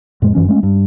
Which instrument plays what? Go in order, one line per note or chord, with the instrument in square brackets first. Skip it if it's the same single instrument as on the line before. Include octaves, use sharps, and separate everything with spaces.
[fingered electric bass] F2 A2 G#3
G1 F#2 E3 C#4
G#3 A3 C#4
G2